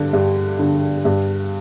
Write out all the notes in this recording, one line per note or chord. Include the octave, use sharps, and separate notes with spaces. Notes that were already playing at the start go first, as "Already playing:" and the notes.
Already playing: G2 D3
G2
D3
G2